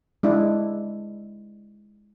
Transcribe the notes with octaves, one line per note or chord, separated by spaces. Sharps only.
G#3 D4 E4